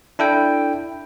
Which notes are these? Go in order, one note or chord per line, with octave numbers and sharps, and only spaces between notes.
D4 E4 A4 G5